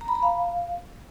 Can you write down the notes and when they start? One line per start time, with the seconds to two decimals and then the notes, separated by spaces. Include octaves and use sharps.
0.01 A#5
0.08 B5
0.15 A#5
0.22 F5